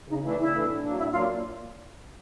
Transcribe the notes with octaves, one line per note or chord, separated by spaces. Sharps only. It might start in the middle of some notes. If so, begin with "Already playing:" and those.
C#3 D#4
E3 A3 D4 E4
C#3 E4
E3 A3 D4
A2
F#3 A#3 D4
A2 E4
F#3 A#3 D4 F4